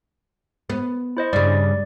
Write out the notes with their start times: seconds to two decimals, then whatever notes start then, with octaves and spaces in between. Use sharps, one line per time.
0.70 B3
1.17 E4 C5 D#5
1.33 G2 C#3 D5